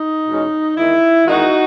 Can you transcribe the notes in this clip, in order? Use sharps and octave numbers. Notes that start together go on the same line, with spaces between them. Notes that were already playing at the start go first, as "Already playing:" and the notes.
Already playing: D#4
E2 B2 G#3 C#4
E2 D#3 G#3 E4
E2 D#3 G#3 D#4 F#4